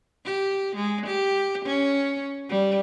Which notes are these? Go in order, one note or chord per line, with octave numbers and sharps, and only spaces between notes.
G4
G#3
G4
C#4
G3